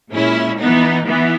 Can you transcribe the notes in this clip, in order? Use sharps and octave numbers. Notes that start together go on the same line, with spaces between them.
A#2 G#3 C#4 E4
E3 B3 D#4
E3 B3